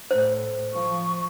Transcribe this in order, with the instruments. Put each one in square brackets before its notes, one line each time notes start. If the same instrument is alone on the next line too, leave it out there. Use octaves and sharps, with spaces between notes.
[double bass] A2 [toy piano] C5
[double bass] F3 [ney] C#6